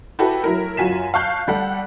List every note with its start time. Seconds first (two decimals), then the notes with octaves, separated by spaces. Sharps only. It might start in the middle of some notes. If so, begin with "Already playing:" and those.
0.19 E4 F#4 G4 A4 B4
0.44 F#3 E4 A#4
0.77 F#2 F4 F#4 G#5 B6 E7
1.14 F5 A5 C#6 F#6 G6
1.48 G3 A4 F#5